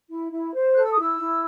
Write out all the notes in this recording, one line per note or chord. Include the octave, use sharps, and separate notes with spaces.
E4
E4
C5
A4 F#6
E6
D#6
E4 E6
E4